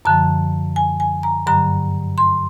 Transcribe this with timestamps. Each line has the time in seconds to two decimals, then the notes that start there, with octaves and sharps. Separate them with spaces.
0.05 F#2 D3 F3 A5
0.76 G#5
1.00 G#5
1.23 A#5
1.47 G2 D3 F#3 A#5
2.18 C6